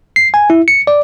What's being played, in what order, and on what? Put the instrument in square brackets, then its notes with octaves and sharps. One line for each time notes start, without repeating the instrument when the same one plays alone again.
[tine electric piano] C7
G#5
E4
C#7
D5